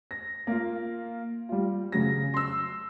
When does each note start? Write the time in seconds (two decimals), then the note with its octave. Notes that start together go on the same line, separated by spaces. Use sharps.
0.11 A#6
0.47 A#3 F4
1.49 G3 F4
1.92 C#3 F#3 F#4 A#6
2.34 C6 E6